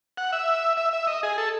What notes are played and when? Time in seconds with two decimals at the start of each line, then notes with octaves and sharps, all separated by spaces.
0.17 F#5
0.32 E5
0.77 E5
0.93 E5
1.07 D#5
1.23 G#4
1.38 A4